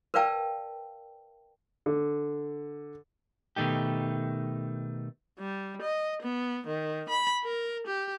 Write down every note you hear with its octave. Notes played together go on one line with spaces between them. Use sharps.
A#4 B4 D5 F5 G5 A5
D3
B2 D#3 A3 D#4 G4
G3
D#5
B3
D#3
B5
A#4
G4